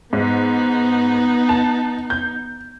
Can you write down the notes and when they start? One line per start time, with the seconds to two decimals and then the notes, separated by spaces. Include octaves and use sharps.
0.13 G#2 B3 D#4
1.49 A5
2.10 G6